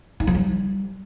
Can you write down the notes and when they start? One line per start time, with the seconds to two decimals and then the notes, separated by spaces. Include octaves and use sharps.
0.20 D#4
0.27 F3
0.35 G3